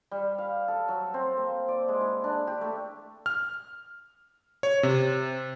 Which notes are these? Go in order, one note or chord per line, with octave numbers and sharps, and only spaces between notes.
G3
F5
A4
F#3
C4
A#3
D5
G#3
E4
D4
G4
A3
F6
C#5
C3